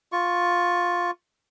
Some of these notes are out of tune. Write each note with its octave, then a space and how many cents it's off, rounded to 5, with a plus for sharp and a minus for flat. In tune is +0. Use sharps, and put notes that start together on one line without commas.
F4 +10 C#6 +0